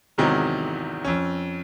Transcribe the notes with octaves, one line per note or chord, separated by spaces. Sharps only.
E2 G#2 C3 D#3 E3 F#3
F2 C#4